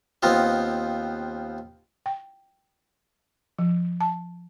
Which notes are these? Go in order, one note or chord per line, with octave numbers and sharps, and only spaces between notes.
D#2 B3 C4 F4 D#5
G5
F3
A5